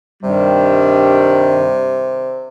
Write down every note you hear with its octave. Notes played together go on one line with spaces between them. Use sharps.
G2 C3 D#3 G3